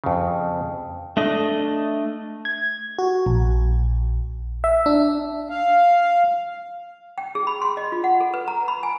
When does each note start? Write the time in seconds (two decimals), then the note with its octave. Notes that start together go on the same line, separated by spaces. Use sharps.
0.04 F2 C#3
1.17 A3 D4 D#5
2.45 G#6
2.99 F#4
3.26 A#1
4.64 E5
4.86 D4
5.50 F5
7.18 G5
7.35 G#4
7.47 B5
7.62 C6
7.77 D#5
7.92 F4
8.04 F#5
8.20 A4
8.34 B4
8.48 A#5
8.68 B5
8.83 G#5